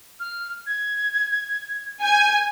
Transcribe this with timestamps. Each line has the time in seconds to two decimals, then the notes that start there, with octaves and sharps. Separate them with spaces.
0.20 F6
0.66 G#6
2.02 G#5 G6